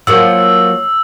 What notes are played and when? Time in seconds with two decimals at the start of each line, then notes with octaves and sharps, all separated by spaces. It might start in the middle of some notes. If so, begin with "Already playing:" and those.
0.07 F3 F#3 A#3 E6